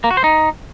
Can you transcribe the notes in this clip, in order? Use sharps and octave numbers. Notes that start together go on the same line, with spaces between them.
A#3
F#4
C5
D#4